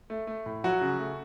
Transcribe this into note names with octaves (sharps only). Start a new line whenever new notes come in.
A3
A3
A2
F#3 F#4
C#3
A3